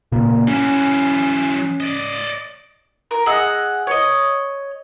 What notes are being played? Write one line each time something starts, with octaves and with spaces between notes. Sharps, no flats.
A#2 C#3 A#3
E3 F#3 C#4
D5 D#5
A#4
G#4 D#5 F#5 E6
C#5 D#5